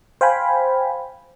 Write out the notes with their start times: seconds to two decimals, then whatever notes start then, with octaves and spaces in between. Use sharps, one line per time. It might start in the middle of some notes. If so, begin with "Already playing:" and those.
0.21 C5 F5 G5 G#5 B5